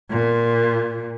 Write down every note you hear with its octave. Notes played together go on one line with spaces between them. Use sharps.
A#2